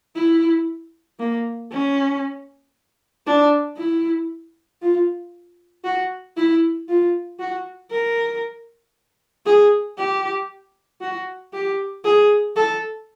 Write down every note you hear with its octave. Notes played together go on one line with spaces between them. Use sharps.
E4
A#3
C#4
D4
E4
F4
F#4
E4
F4
F#4
A#4
G#4
G4
F#4
G4
G#4
A4